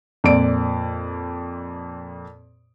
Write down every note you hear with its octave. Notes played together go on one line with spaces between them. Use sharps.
F2 A#2 D5 D7